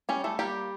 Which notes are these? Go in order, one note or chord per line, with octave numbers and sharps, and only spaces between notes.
G3 C#4 C#5
A3 A4
G3 A#3 G4